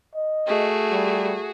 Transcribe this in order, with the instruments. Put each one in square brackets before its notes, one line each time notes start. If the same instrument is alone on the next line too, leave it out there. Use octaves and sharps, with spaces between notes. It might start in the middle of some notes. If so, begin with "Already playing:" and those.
[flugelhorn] D#5
[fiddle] A3 [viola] F#4 G#4
[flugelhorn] G3